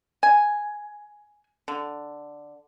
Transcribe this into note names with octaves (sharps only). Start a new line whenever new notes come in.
G#5
D3